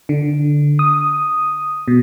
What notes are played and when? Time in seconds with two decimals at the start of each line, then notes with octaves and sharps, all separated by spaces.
0.09 D3
0.79 D#6
1.88 B2